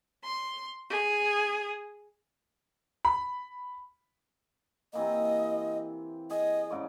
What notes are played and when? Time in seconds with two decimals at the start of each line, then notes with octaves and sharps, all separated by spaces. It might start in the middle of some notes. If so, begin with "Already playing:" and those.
0.23 C6
0.89 G#4
3.05 B5
4.93 C3 E3 A#3 D#5
6.31 G#4 D#5
6.71 G#2 C#3 D5